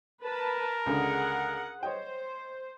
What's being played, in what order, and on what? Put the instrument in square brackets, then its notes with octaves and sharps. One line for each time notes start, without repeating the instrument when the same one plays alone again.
[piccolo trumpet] A#4 [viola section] B4 A5
[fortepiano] C#2 D3 [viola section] G#4 F#5
[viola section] C5 [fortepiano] C#5 D#5 G5